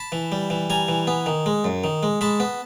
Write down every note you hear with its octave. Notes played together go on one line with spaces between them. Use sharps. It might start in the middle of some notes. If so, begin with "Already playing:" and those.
Already playing: A5 B5
E3
G3
E3
G3 G#5 A#5
E3
B3
D#3
G#3
F#2
D#3
G#3
G#3 A5 B5
B3